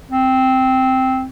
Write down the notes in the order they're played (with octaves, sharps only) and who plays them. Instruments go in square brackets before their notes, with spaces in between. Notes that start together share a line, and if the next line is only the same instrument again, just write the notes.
[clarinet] C4